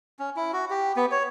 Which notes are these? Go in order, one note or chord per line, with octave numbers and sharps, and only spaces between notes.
C#4
E4
F#4
G4
B3
C#5